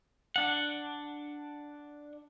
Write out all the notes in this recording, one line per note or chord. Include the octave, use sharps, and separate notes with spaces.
D4 F#5